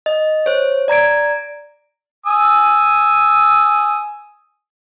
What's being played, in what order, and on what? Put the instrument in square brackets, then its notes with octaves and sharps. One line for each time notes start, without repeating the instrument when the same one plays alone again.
[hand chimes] D#5
C5 C#5
D5 A#5 G#6 D7
[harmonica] G#5 D#6 E6